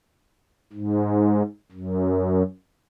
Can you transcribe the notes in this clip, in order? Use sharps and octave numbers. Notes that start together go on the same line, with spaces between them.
G#2
F#2